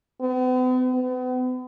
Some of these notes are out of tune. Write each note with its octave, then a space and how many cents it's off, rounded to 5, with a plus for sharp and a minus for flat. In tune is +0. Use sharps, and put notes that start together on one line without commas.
B3 +45
B3 +40